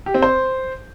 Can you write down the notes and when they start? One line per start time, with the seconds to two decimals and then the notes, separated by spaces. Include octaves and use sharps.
0.06 G4
0.14 C4
0.23 C5